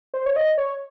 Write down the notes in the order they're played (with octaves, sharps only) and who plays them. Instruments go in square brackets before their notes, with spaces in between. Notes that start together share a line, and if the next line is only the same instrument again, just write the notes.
[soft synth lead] C5
C#5
D#5
C#5